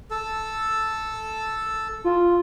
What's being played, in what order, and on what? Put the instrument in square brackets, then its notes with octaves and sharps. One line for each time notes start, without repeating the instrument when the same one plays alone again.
[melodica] A4
[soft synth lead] F4